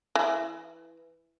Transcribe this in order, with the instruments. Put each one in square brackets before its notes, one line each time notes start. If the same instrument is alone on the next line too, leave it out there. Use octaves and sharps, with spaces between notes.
[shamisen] E3